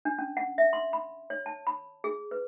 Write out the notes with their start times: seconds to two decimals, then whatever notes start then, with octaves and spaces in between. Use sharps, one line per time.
0.05 D4
0.19 C#4
0.37 F#5
0.58 E5
0.73 C6
0.93 B5
1.30 C#5
1.46 A5
1.67 B5
2.04 G#4
2.31 B4